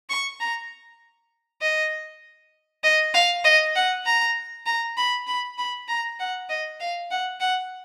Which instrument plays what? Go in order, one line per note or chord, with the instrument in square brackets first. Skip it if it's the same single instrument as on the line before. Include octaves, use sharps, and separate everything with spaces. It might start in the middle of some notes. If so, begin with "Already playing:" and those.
[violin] C#6
A#5
D#5
D#5
F5
D#5
F#5
A#5
A#5
B5
B5
B5
A#5
F#5
D#5
F5
F#5
F#5